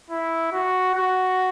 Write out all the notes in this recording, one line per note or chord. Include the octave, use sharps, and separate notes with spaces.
E4
F#4
F#4